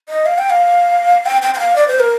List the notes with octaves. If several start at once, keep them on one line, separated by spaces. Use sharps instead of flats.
D#5
F5
G5
F5
G5
G5
G5
F5
D5
C5
A#4